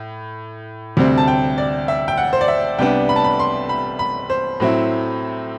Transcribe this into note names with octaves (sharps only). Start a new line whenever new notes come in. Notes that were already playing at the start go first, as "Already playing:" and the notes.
Already playing: A2
D2 C3 G3 C4
A5
G5
D5
E5
G5
F#5
C5
D5
E5
C2 C3 G3 B3 D4 G5
B5
A5
B5
C6
B5
B5
C5
A2 F#3 C4 E4